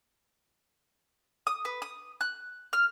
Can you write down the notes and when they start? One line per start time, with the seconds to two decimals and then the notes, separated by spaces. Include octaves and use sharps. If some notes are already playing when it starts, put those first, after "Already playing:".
1.47 D#6
1.65 B4
1.82 D#6
2.21 F#6
2.73 F6